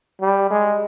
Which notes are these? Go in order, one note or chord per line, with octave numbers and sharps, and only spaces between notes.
G3
G#3